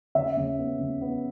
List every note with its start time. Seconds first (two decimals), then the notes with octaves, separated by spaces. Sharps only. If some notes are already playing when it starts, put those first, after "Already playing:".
0.15 C#3 E5
0.37 C#3
0.58 B3
0.80 C#3
1.01 B3